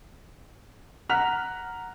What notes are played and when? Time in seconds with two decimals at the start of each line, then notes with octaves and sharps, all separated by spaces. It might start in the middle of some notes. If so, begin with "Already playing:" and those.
1.09 F#5 A#5 F6 F#6 B6 F7